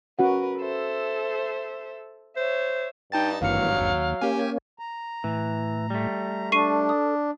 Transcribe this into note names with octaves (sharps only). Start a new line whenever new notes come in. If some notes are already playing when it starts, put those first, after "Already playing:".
C#4 F#4 A#4 B4 F#5
A4 C5 E5
C5 C#5 E5
G2 D#4 G5 A5 A6
G#1 G2 E3 F#3 A#3 F5 C#7
D#2
A#3 C#4 G4 G#5
A#5
A2 E3
G3 A3
D4 A4 C#6 C7 D#7
D#6